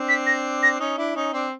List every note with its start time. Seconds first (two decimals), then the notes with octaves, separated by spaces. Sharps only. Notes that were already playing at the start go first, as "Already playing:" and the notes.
Already playing: C4 D4
0.09 B6
0.27 A#6
0.63 A#6
0.80 C#4 D#4
0.98 D4 E4
1.16 C#4 D#4
1.33 C4 D4